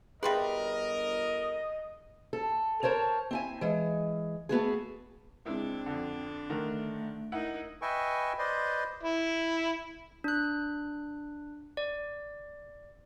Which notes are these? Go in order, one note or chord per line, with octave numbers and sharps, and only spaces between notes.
G1 G3 C4 G#4 A#4 B4 D#5 E5
A4
A#4 C5 C#5 A5
C4 E4 G#5
E3 G#3
A3 B3 F#4 G#4
C#2 G#3 C4 D4 E4
F2 D3
D3 D#3 A3 A#4
D#4 E4 A#4 F#5
B4 D#5 E5 G5 G#5 C#6
B4 C5 D5 D#5 C6
E4
D4 F#6
D5